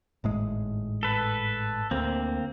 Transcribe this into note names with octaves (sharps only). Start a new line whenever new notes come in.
G#1 A2 G#3
A4 B4
D2 A#3 C4